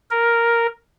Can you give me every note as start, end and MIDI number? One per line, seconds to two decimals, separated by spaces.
0.11 0.67 70